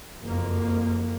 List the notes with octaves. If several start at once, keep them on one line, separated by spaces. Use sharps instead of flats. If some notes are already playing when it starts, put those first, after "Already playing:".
F#1 F2 A#3